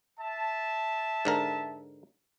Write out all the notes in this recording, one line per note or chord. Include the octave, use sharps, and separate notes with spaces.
E5 A5
G#2 D3 A#4